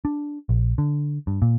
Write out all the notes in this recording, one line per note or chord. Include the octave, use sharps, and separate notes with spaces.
D4
A#1
D3
G2
A#2